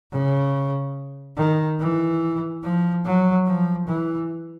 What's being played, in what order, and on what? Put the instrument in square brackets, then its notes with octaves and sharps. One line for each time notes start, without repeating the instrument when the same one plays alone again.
[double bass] C#3
D#3
E3
F3
F#3
F3
E3